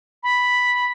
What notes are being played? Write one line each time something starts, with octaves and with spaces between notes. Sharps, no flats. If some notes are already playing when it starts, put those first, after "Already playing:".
B5